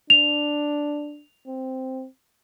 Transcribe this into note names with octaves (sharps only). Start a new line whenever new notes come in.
D4 F7
C4